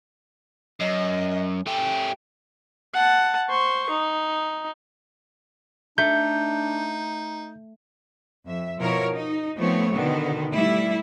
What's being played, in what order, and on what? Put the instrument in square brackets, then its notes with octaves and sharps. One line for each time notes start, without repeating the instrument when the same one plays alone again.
[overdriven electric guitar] F#2 [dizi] D#5
[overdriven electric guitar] A3 G4 [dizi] G5
[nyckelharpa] F#5 A5
C5 C#6
D#4
[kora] A3 [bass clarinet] D4 [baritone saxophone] D#4 [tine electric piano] G6
[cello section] F2 E5
B2 F3 E4 A#4 C#5
D#4
F3 A3 B3 C4 C#5
B2 D3 D#3 B3
G3 A3 E4